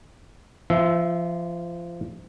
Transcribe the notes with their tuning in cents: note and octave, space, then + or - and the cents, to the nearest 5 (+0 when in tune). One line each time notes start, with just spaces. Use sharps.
F3 -25 E5 +0